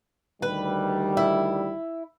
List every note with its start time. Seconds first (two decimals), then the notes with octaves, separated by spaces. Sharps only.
0.42 D2 D#3 G3 B4
1.17 E4